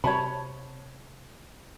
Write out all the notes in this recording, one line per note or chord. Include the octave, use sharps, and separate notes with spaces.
C3 C#5 A5 B5